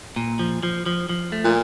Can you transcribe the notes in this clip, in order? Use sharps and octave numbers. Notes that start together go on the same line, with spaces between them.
A#2
F3
F3
F3
F3
A3
A#2